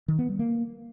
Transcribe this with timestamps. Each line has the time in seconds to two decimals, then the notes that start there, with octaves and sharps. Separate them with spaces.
0.08 D#3
0.19 B3
0.29 G3
0.39 A#3